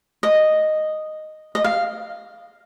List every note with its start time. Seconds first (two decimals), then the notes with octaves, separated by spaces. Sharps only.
0.23 D#5
1.55 D#5
1.64 F5